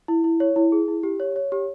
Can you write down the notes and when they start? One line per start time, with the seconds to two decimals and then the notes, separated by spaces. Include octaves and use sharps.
0.08 E4
0.24 E4
0.40 C#5
0.56 E4
0.72 G#4
0.88 E4
1.03 G4
1.20 C#5
1.36 C#5
1.52 G4